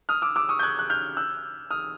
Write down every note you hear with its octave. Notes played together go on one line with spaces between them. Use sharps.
D#6 F6
D6 E6
D6 E6
C#6 D#6
G6
F#6 G#6
F#6
F6 G6
E6 F#6
D#6 F6